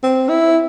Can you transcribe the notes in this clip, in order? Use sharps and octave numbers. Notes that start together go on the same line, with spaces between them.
C4
E4